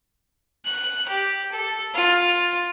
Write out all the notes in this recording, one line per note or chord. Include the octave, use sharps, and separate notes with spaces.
F#6
G4
A4
F4